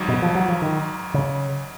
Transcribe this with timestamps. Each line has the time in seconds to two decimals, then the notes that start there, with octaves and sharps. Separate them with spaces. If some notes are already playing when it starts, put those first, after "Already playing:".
Already playing: G#1 G#2 F#3
0.08 B2
0.22 F3
0.35 F#3
0.49 F3
0.62 D#3
1.14 C#3